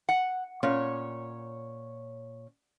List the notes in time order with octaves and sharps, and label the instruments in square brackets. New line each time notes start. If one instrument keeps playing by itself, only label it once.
[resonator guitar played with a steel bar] F#5
[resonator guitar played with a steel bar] A#2 [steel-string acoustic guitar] C#4 C#5